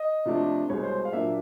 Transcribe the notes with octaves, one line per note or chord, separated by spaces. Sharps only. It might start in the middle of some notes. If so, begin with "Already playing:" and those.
Already playing: D#5
C3 F3 A3 D4
C2 B2 G#3 C4 C#5
C5
F5
A#2 F#3 A#3 D4 E5